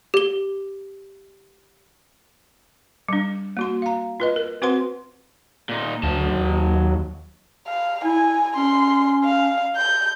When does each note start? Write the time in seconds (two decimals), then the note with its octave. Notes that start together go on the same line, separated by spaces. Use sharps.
0.14 G4 G7
3.09 G3 D4
3.57 A#3 F#4 C6
3.82 F5 A#5
4.20 F4 B4 D#5
4.36 A#4
4.62 C4 F#4 B4 C5 F#5 C6
5.69 A#2 D#4
6.03 D2 F#3 A5
6.32 D#2
7.67 F5
8.04 E4 G#5
8.56 C#4 C6
9.24 F5
9.77 G6